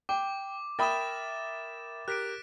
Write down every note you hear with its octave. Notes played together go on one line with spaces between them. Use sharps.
G5 D6
A#4 E5 G5 B5 D#6 A6 E7
G4 A#4 F#6 B6 D7